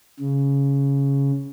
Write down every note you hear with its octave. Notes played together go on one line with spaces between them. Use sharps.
C#3